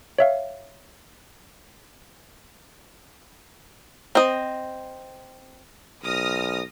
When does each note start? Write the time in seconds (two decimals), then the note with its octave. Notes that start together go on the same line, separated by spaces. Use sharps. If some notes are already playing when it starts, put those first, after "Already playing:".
0.19 C#5 E5 F5
4.15 C4 D#5
6.04 B1 D#6 F6 A#6